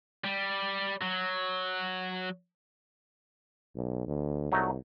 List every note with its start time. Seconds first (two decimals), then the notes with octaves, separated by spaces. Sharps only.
0.24 G3
1.01 F#3
3.76 B1
4.07 D2
4.52 C2 F#3 A3 D#4